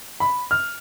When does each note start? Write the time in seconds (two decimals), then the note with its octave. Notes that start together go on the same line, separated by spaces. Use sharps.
0.20 B5
0.51 F6